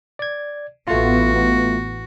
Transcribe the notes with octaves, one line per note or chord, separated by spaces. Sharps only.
D5 G#6
A1 A3 B3 F4 F#4